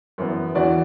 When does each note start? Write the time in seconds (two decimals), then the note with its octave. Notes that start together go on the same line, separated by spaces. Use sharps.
0.18 F#2 E3 B3
0.55 E2 E3 D4 F#4 D5